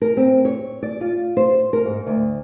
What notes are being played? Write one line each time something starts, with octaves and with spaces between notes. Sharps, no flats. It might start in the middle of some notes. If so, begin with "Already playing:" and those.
A#4
C4
C#5
D5
F4
C5
A#4
G#2
D2